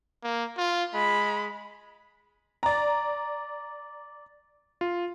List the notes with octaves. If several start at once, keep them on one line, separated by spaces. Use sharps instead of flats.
A#3
F4
G#3 B5
D5 A#5
F4